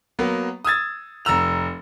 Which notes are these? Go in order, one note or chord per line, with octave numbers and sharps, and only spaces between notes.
F#3 A#3 B3
D#6 E6 G#6 A6
F1 A#5 E6 F7